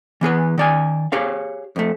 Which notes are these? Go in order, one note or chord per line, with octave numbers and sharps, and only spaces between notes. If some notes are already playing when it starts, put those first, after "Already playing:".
E3 B3 G#4 B4
D#3 D5 G#5
G4 G#4 C#5 F5
F2 A3